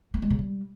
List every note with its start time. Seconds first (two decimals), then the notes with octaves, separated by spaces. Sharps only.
0.14 A3
0.22 G#3
0.30 C#3
0.39 G3